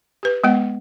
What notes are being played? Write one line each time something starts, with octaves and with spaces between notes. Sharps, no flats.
G4 B4
G#3 B3 F#5